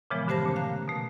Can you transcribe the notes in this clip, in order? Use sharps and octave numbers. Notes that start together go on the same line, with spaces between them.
A#2 C#3 E3 F3 G#3 B3
G2 D3 G4 C5 A5 A#6
A#2 A3 C#4
F5 A#5 F#6
B2 A3